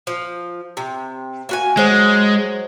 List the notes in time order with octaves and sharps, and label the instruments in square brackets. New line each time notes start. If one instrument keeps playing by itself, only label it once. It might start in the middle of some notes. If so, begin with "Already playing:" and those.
[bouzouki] F3
C3
A#3 F#4 G#5
[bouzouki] F#3 C5 [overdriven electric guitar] G#3